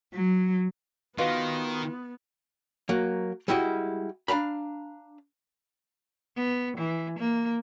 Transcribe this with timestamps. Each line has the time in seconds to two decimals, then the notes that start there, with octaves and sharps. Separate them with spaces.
0.13 F#3
1.18 D#3 B3 F4 F#4 B4 D#5
2.89 F#3 A#3
3.48 G3 G#3 E4 F#4 D#5
4.28 D4 F5 A#5 B5
6.36 B3
6.77 E3
7.19 A#3